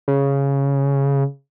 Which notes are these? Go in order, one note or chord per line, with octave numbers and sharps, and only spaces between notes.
C#3